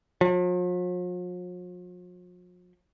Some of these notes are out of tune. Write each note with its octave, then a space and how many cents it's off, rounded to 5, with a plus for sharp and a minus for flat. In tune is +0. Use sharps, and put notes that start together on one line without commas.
F3 +45